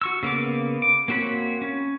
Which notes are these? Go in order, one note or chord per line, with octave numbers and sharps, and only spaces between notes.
F#4 C#6 E6
C#3 A#3 B3 D6
D6
A#3 C4 F#4 C#5 B5
C#4